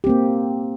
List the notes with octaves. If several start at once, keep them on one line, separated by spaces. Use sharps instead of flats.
A#3 C4 G4